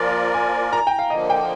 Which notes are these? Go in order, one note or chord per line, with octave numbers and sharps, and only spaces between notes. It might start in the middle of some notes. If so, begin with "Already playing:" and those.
Already playing: F3 A#3 F4 A#4 D5 G#5
G#5
A#5
G5
F5
D3 F3 A#3 D#5
G5